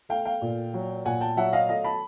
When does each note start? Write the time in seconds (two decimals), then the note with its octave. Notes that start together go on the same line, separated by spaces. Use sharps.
0.09 A3 F5 G5
0.25 F5 G5
0.42 A#2
0.74 F#3
1.06 A#2 F#5 G#5
1.21 G5 A5
1.37 F#3 E5 F#5
1.53 D#5 F5
1.69 A3 D#5 F5
1.84 A5 B5